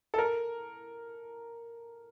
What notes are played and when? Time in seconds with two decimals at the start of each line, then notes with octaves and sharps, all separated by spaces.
0.14 A4
0.18 A#4